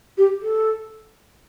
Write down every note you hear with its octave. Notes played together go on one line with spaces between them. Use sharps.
G4
A4